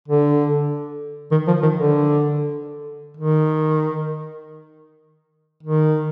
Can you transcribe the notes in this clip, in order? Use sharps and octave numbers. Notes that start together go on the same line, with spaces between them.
D3
D#3
F3
D#3
D3
D#3
D#3